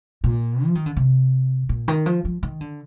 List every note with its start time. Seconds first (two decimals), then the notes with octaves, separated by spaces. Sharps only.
0.24 A#2
0.65 F3
0.75 D#3
0.86 D3
0.97 C3
1.69 A#2
1.88 D#3
2.06 F3
2.25 F3
2.43 D#3
2.61 D3